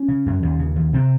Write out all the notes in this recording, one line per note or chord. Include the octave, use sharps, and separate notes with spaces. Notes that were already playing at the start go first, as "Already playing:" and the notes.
Already playing: C#4
C#3
F#2
D#2
C#3
D#2
C3 C4